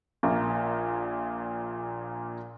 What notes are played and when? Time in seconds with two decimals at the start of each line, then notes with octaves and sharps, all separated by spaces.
0.23 A#1 A#2 A#3